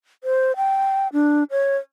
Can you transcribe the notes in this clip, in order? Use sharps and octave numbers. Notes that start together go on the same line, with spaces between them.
C5
G5
D4
C#5